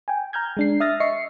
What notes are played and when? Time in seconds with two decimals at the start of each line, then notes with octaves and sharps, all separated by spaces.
0.08 G5 G#5
0.33 A#5 F6 G6 G#6
0.57 G#3 D4 C7
0.80 E5 D#6 F6 A6 A#6
1.00 D#5 E5 C#6 C7 C#7